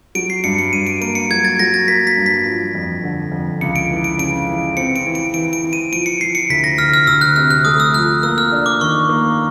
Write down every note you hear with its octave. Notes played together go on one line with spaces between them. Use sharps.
F#3 D7
C7
G2 C#7
C#7
G2 D#7
D7
A#3 D7
C#7
F#3 G#6
A6
F#3 A#6
A6
A#3 B6
B6
G2
B6
F3
F2
D3
F2
C#2 C#7
D7
E3
D7
C#3 D7
E3
C4 C#7
D7
E3
D7
E3 D7
D7
E3
D#7
F3 D7
C#7
F3 C7
C#7
D2 B6
A#6
D2 F6
F6
D2 E6
F#6
C3 F6
F#6
A3 D#6
E6
F3 F#6
A#3 E6
F6
D4
D6
D#3 C#6
A#3